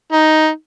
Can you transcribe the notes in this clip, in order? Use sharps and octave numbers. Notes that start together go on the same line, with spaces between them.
D#4